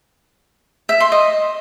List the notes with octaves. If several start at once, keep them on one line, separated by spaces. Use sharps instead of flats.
E5
C6
D#5